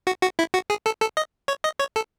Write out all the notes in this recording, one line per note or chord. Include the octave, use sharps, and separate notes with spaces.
F#4
F#4
E4
F#4
G#4
A4
A4
D#5
C#5
D#5
C#5
A4